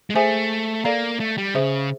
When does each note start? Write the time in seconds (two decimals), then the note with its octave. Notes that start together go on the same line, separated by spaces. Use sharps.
0.10 G#3
0.15 A3 G#4 C5 E5 G#5
0.84 A#3 A4 D5 F5 A#5
1.20 A3
1.38 G3
1.54 C#3 G#4 C5 E5